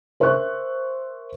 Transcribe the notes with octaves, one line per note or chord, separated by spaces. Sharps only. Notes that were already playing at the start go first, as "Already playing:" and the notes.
A#4 C5 E5 C#6 F#6